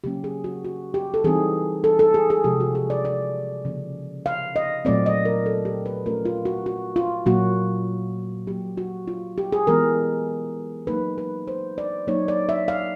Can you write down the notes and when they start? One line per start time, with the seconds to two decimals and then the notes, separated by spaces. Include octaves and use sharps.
0.04 C#3 F#3 A#3 C#4 G4
0.24 G#4
0.44 F#4
0.65 F#4
0.94 G4
1.14 A4
1.24 E3 G3 C4 D#4 G#4
1.84 A4
1.99 A4
2.14 G#4
2.30 G#4
2.44 C3 F3 G#3 G4
2.60 F#4
2.75 G#4
2.90 D5
3.05 D5
3.65 C#3 F3 A#3
4.26 F5
4.56 D#5
4.85 A#2 F#3 A3 C4 D5
5.06 D#5
5.25 A#4
5.46 A4
5.65 G4
5.86 B4
6.06 F3 A3 C#4 F4 A#4
6.25 F4
6.45 F#4
6.66 F#4
6.96 F4
7.26 A#2 F#3 A#3 F#4
8.46 A#2 F#3 A#3 G4
8.77 F#4
9.08 F4
9.38 G4
9.52 G#4
9.67 E3 G#3 B3 A#4
10.87 F#3 A#3 D#4 B4
11.18 B4
11.48 C5
11.78 D5
12.07 F#3 A#3 D#4 C#5
12.28 D5
12.49 E5
12.68 F5